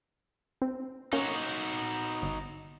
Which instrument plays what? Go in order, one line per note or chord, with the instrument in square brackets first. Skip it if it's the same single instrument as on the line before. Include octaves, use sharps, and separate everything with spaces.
[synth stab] C4
[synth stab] A#3 C#4 [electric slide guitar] D#4 F#4 C#5
[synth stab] G1